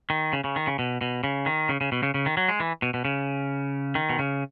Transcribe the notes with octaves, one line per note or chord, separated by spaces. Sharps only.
D#3
C#3
C#3
D#3
C#3
B2
B2
C#3
D#3
C#3
C#3
B2
C#3
C#3
D#3
F#3
G#3
E3
B2
B2
C#3
D#3
B2
C#3